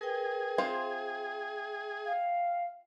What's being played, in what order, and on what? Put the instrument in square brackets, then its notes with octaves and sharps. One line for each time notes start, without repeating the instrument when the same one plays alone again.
[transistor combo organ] G#4 [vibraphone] A#4 B4 G5
[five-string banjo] C4 F4 C5 [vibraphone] E5 G5
[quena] F5